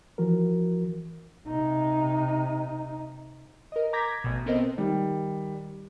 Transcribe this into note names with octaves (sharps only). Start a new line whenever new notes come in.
E3 F3 F#4 A#4
C3 D#4
A#4 D#5
A#5 D6 G6 G#6 A#6 B6
A1 B2
B3 C4 A4 A#4 C5 D#5
D#3 G3